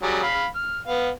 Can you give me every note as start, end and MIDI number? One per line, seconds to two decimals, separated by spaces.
0.03 0.21 54
0.03 0.21 55
0.03 0.21 68
0.23 0.45 77
0.23 0.45 83
0.55 0.79 89
0.88 1.09 59
0.88 1.09 77